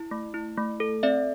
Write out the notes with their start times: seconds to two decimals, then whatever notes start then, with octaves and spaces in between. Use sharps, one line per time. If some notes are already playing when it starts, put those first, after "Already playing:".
Already playing: E4
0.11 A3
0.34 E4
0.57 A3
0.80 A4
1.03 C4 D5 E5